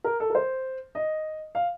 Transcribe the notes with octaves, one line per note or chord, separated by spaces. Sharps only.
A#4
A4
A#4
C5
D#5
F5